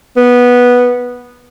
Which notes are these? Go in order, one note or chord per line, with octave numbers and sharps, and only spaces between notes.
B3